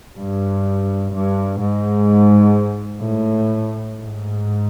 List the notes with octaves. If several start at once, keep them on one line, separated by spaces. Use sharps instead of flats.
G2
G2
G#2
A2
G#2